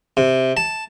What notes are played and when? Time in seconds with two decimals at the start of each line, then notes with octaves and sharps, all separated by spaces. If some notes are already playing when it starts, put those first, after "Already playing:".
0.17 C3
0.57 A5